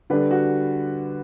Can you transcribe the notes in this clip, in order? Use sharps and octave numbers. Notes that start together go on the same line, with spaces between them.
D3 G3 D4 B4
F#4